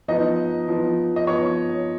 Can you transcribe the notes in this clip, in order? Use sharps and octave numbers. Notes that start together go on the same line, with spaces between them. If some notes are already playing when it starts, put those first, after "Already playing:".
F3 B3 D#4 D#5
F3 B3 D#4
D#5
F3 B3 D#4 C#5